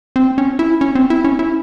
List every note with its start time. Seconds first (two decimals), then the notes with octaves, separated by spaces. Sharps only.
0.16 C4
0.38 C#4
0.59 E4
0.81 C#4
0.95 C4
1.10 E4
1.24 C#4
1.39 E4